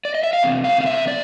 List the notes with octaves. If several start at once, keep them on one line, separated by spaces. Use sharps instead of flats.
D5
D#5
E5
F5
E2 C3
F5
F5
E5
D5